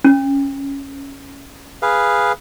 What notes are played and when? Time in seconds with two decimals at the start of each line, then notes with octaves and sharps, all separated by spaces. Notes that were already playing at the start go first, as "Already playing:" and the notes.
0.04 C#4
1.82 G#4 B4 F5